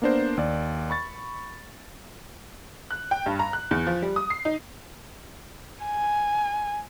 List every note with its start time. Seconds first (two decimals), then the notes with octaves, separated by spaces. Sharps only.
0.02 A#3 B3 D4 A#4 C5
0.37 D#2 D5
0.90 B5 C#6 A6
2.91 F#6
3.11 G5
3.26 G2
3.39 A#5
3.53 F#6
3.71 E2
3.87 F3
4.02 G3
4.16 D#6
4.30 C7
4.45 D#4
5.85 G#5